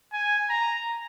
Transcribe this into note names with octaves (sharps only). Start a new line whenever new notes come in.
G#5
A#5